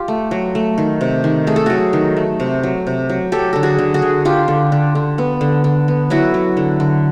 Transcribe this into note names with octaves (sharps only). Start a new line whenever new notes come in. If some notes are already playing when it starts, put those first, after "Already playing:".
Already playing: F4 G4
A3
F#3
A3
D#3
C3
D#3
A3 G#4
A4
F#3 F#4 G#4
D#3
A3
C3
F#3
C3
F#3
F#3 G4 A4
D3 A4
F#4 G#4
D3
F#4 G#4
D3
D3 F4 G4
D3
D3
D3
B3
D3
D3
B3
F#3 E4 F#4
F#3
D3
D3